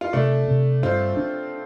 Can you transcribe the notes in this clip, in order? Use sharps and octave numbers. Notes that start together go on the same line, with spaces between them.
F4
C3 A3 D4
C3
G2 C4 F4
D4